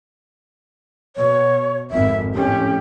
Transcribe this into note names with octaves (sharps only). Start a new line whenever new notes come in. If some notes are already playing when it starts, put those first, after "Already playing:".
B2 C#5
G#1 F2 E5
F2 A2 C#4 G4